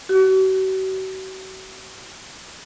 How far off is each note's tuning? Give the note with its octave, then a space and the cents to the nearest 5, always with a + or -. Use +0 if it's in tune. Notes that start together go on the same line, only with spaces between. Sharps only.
F#4 +40